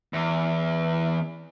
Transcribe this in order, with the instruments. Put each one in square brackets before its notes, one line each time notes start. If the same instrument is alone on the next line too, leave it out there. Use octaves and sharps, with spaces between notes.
[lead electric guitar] E2